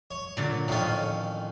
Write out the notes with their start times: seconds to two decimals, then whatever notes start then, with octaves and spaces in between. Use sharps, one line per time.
0.11 C#5
0.37 A#2 D3 F#3
0.68 F2 A2 D#3 C#4 F4